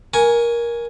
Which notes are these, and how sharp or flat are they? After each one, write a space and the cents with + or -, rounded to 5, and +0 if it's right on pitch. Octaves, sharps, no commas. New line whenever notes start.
A#4 +15 G#5 +0 C#6 +20